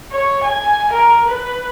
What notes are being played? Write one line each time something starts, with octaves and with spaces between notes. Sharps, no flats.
C#5
G#5
A#4
B4